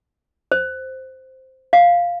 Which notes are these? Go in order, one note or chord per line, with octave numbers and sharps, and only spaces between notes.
C5
F5